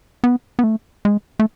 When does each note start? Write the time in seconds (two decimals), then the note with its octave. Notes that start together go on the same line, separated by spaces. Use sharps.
0.24 B3
0.59 B3
0.64 A3
1.05 G#3
1.40 A3